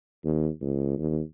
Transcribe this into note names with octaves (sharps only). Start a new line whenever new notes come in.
D#2
C#2
D#2